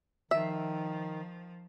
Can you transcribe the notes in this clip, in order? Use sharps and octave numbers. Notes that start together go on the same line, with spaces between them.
D#3 F3 E5